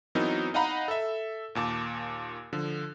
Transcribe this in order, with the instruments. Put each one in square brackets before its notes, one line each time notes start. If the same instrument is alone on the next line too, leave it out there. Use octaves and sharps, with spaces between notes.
[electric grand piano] E3 F#3 B3 C4 D#4 A#4
D#4 D#5 F5 F#5 A#5 B5
A4 E5
D#2 A#2 A5 D6
D3 F3